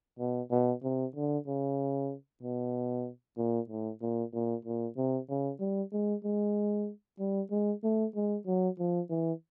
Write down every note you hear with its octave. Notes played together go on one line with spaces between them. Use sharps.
B2
B2
C3
D3
C#3
B2
A#2
A2
A#2
A#2
A#2
C3
C#3
G3
G#3
G#3
G3
G#3
A3
G#3
F#3
F3
E3